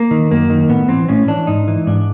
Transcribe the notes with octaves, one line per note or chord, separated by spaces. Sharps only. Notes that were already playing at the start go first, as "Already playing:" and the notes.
Already playing: A#3
D#3
F#2 A#3
D#3
A2 B3
E3 C4
A2 C#4
E3 D4
G#2 D#4
E3
G#2 D4